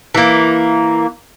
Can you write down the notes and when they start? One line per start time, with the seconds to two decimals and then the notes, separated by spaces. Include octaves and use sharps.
0.15 E3 A#3